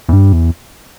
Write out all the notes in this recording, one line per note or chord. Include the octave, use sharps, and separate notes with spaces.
E2
G2
E2